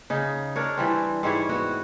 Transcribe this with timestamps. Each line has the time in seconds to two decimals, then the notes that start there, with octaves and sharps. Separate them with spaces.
0.10 C#3 D#4
0.56 D4 A#4 C#5
0.77 E3 G3 C4
1.23 G#2 G3 E4 C#5
1.49 B3 F#4